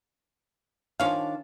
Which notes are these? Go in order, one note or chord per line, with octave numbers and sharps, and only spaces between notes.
D#3 F3 D4 C#5 F5 G#5